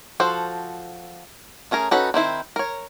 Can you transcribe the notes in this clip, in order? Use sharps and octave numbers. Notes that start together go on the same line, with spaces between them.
F3 F#4 A4 C5
A3 C#4 G#4 A#4
C#4 D#4 F#4 A4 B4
D#3 C4 E4 C5
A#4 C#5